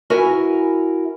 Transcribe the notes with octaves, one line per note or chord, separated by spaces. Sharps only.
E4 F#4 A#4 E5 G#5